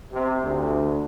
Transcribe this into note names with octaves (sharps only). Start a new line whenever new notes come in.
C3
D2